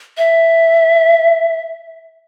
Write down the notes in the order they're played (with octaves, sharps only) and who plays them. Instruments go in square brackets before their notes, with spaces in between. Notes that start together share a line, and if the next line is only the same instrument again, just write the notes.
[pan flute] E5